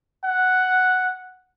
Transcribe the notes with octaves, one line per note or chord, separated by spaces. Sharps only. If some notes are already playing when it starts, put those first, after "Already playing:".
F#5